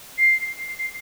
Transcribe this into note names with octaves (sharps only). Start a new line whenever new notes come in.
C7
C7